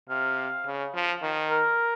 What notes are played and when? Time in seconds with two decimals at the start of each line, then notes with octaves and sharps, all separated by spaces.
0.10 C3 F5
0.66 C#3
0.94 F3
1.22 D#3
1.50 A#4